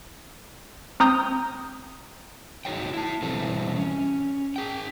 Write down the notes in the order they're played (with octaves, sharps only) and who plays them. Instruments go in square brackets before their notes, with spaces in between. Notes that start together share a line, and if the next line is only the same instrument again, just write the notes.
[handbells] C4 A#5 D#6 G6
[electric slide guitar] D#4 F#4 G#4 C#5 G5
E4 A5
B2 E3 G3 C4 A4
C#4
G#4 G5